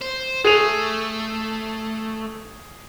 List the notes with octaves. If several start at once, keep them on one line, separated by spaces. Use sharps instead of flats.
C5
A3 G#4 D#7 F7